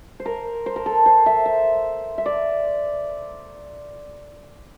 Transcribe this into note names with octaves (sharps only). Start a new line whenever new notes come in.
C5
A#4
C5
A#4
A4
C5
E5
E5
E5
D5